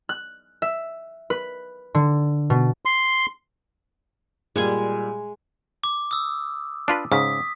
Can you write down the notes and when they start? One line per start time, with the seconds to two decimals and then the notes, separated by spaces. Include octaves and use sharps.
0.09 F#6
0.62 E5
1.30 B4
1.95 D3
2.50 B2
2.85 C6
4.56 A#2 G3 G#3 G#4 G#5
5.84 D6
6.11 D#6 E6
6.88 D4 F4 B4
7.12 G#2 C#3 D#6 B6